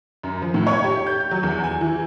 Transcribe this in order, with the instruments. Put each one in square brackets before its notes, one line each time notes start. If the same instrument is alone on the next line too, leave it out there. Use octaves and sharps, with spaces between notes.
[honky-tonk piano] F#2
F3
A2
C#5
G4
G6
F#3
E2
G#5
E3